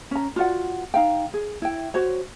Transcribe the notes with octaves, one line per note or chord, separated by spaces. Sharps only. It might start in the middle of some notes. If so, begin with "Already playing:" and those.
C#4 A#5
F4 F#4 D5 F#5
D#4 F5 G5
G#4
E4 G5
F#4 C5 C#5